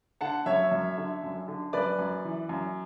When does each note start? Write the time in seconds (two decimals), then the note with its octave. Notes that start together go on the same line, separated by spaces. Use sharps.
0.21 D3 F#5 A5
0.46 F#2 C#5 E5
0.72 F#2
0.97 D3
1.23 F#2
1.48 D3
1.73 F#2 B4 D5
1.99 F#2
2.25 E3
2.49 F#2